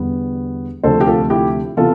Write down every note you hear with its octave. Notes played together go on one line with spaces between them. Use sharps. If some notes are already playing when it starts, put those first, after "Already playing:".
Already playing: E2 D3 G3 B3
D2 C3 F3 A3 A4 C5
G4
F4 A4
E4 G4
C3 E3 B3 F4 A4